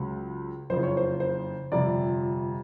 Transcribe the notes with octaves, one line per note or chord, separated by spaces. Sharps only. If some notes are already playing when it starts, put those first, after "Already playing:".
Already playing: C#2 C#3 F#3
F#1 F2 C#3 C5
C#5
C5
C5
G1 F2 C3 F3 D5